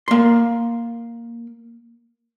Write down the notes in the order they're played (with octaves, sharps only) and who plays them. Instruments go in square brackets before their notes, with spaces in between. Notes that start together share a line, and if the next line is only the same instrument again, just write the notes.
[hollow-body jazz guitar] A#3 C6